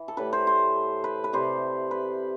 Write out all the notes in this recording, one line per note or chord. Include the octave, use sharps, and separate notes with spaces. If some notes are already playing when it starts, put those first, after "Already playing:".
Already playing: E3
A4
A2 G3 B4
C5
C5
B4
B4
C3 G3 C5
B4